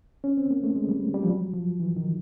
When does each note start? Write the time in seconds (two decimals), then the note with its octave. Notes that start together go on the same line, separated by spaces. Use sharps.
0.24 C#4
0.37 C4
0.51 A#3
0.64 A3
0.76 G#3
0.89 G3
1.14 G3
1.24 F3
1.28 F#3
1.53 F3
1.80 E3
1.96 D#3